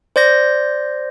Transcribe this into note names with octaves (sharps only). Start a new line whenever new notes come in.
C5 D5 G6 A#6